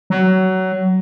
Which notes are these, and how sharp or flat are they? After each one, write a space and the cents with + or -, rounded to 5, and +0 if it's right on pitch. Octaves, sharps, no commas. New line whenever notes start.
F#3 +20